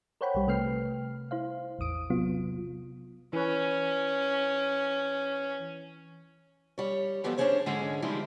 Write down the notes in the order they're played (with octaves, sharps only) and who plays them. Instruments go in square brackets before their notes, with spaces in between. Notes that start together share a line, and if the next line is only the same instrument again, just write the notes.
[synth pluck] A#4 C5 C#5 F#5 G5 B5
B1 G3
C3 A3 B4 G5 F6 C7
E4 C5 F5
A1 E2 D#6 D7
C3 F#3 B3 F4
[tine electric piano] E3 B4 [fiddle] C#4
[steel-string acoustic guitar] G3 C#5
E3 F3 G3 B3 G4 A4
C#4 D4 F4 G#4 C5 C#5
G#2 D3 F3 G#3 C#4 G#4
E3 F3 G3 G#3 D#4 E4